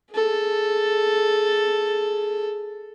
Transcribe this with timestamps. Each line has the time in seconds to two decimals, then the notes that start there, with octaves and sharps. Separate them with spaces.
0.14 G#4 A4